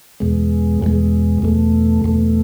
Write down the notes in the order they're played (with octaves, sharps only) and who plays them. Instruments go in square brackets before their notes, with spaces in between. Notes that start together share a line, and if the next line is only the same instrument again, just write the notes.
[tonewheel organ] E2 B2 G#3
E2 B2 G#3
E2 B2 A3
E2 B2 A3